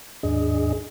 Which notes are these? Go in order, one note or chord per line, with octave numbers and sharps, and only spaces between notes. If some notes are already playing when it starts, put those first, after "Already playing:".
D#2 G#2 D4 G#4 D#5